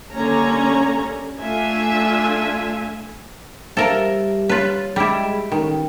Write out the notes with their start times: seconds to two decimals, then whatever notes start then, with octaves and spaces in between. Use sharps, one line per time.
0.12 D3 G3 A#3 C#4 C#5 A#5
1.41 A3 D4 F4 E5 G#5
3.77 G3 A4 A#4 C5 E5 F5
4.49 F4 B4 C#5
4.96 G3 G#3 E4 B5 B6 D7
5.52 A1 D#3 G5